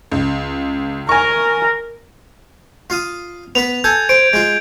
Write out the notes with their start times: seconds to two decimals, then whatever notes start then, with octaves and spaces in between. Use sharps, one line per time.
0.11 C#2
1.09 A#4 G#5 C#6
2.90 F4 F5 D#6
3.55 B3 B4 F7
3.84 A4 G#5 A5 G6 G#6
4.09 C5 D7
4.33 G#3 F4